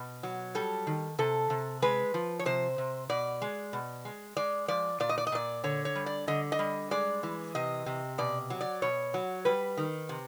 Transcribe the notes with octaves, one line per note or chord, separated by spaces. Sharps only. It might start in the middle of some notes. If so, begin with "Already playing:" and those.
Already playing: B2
F#3
G3 A4
D#3
C3 A4
C3
G#3 B4
F3
C#5
C3 C5
C3
B2 D5
G#3
B2
G#3
G#3 D5
F3 D5
A#2 D5
D#5
D5
D#5
A#2 D5
D3 C#5
C#5
G3
D5
D3 D#5
D#5
G3
G#3 D5
E3
C3 D#5
C3
B2 D5
F#3
D5
B2 C#5
F#3
G3 B4
D#3
C3